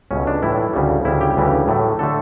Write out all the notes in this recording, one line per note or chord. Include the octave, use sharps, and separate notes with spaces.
C#2 B2 A3 C#4
D4
A2 E3 G3 E4
D2 C#3 G3
D2 C#3 G3 E4
G4
D2 C#3 E3 G3
A2 F#3 A3
D3 A3 A4